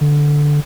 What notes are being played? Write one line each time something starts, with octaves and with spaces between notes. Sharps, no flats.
D3